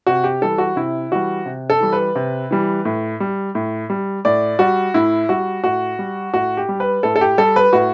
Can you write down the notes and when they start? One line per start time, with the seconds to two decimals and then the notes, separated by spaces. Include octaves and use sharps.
0.07 C3 F#4
0.24 G4
0.41 E3 G3 A4
0.58 F#4
0.76 C3 E4
1.12 E3 G3 F#4
1.46 C3
1.70 A4
1.80 E3 G3
1.93 B4
2.15 C3
2.51 E3 G3
2.85 A2
3.20 G3
3.55 A2
3.90 G3
4.25 A2 D5
4.59 G3 F#4
4.94 A2 E4
5.29 G3 F#4
5.64 A2 F#4
5.99 G3
6.33 A2 F#4
6.57 G4
6.69 G3
6.80 B4
7.03 A2 A4
7.16 A4
7.21 G4
7.38 G3 A4
7.56 B4
7.73 A2 F#4